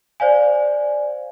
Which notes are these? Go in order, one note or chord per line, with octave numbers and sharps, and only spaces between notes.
C5 D5 F5 G#5